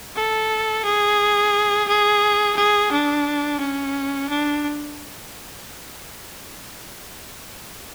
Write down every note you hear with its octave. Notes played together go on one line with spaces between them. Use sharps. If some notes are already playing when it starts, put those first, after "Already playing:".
A4
G#4
G#4
G#4
D4
C#4
D4